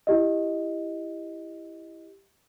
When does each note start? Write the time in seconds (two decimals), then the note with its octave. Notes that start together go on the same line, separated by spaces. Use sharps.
0.07 E4 G4 D#5